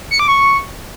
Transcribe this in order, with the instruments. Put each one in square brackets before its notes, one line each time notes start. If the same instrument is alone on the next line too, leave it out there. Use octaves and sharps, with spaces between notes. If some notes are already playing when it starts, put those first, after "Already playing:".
[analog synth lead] C#7
D6
C#6